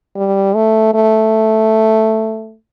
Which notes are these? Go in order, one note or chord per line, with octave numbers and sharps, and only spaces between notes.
G3
A3
A3